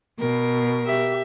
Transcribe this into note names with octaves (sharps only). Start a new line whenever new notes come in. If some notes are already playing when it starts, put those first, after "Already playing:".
B2 A#4
G4 E5